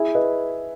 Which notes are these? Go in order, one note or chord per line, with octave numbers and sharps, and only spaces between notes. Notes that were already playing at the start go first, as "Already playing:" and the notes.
Already playing: E4 G#4
B4 D#5